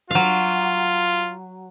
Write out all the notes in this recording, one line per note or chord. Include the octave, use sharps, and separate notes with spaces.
F#3 F4 F5